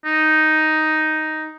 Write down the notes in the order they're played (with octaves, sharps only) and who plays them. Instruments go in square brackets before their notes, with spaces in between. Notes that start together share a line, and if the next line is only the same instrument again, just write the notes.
[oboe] D#4